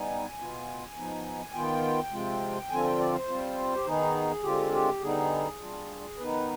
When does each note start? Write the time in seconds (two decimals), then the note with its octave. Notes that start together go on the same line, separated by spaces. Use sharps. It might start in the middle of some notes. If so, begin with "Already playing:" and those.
Already playing: G3 B3 D#4 G#5
0.38 B2 B3 F4
0.95 F3 B3 D#4
1.54 D#3 B3 F4 G5
2.12 C3 F3 G#3 C4 F4
2.70 D3 F3 C4 F4 G#5
2.84 G5
2.98 D5
3.13 C5
3.28 G3 C4 F4
3.74 G4
3.86 D#3 B3 D#4 G#4
4.43 D3 G#3 C4 F4 G4
4.73 G4
5.01 D3 G3 B3 D#4 G#4
5.60 G3 D4 F4
6.18 D#3 B3 D#4 B4